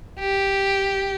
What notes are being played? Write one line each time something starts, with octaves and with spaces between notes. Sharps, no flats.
G4